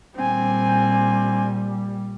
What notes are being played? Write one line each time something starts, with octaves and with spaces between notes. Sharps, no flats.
A#2 G3 C4 G#5